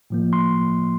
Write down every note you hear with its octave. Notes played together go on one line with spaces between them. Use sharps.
A2 F3 A#3
C6